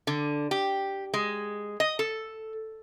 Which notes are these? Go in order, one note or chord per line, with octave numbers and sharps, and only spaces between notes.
D3
G4
G#3
D#5
A4